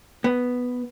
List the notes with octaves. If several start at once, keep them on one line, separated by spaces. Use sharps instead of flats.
B3